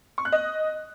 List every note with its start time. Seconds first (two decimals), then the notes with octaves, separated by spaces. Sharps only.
0.18 C#6
0.25 F#6
0.32 D#5